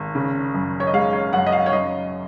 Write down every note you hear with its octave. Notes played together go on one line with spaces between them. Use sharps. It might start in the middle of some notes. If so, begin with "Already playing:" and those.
Already playing: G#1
C#3
F#2
C#5
D#5
G#3 F5
C#5
F#2 F#5
D#5
F5
C#5
F#2 D#5